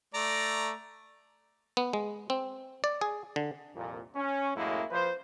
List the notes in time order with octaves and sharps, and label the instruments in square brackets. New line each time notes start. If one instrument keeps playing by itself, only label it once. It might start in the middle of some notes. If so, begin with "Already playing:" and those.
[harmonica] A3 D5 A#5
[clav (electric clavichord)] B3
G#3
C4
D5
G#4
D3
[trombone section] C2 F2 A#2
C#4
F#2 A2 G#3 A#3 E4
F3 B4 C5